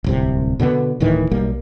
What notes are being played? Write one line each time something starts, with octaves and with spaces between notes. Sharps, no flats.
D1 C2 C3
B2 D3 A3 B3
D1 A2 D#3 E3
B1 G3 A#3